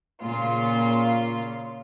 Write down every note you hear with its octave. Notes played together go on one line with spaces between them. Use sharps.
A#2 C#3 F4